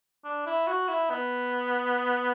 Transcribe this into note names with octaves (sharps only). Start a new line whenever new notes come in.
D4
E4
F#4
E4
B3